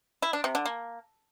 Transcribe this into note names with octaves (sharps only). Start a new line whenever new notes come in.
E4
D4
C3
D3
A#3